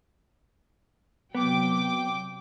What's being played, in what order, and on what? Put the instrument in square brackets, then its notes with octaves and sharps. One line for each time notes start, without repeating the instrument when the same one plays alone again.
[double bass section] C3 F#3 [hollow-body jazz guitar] B3 [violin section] G5 D6